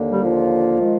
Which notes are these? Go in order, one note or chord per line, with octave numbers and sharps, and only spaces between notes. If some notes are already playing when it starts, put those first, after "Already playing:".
Already playing: D#2 D3 A#3
G3 G4
F3 F4
D#3 G#3